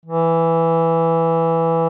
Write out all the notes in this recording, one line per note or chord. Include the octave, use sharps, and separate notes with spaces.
E3